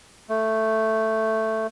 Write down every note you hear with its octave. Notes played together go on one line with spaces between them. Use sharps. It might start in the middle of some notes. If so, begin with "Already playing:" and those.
A3